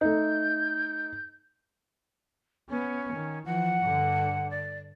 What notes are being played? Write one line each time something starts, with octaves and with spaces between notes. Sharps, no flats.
A3 D#4 G6
B3 C#4
D#3
E3 F3 F#5
G2 D3
D5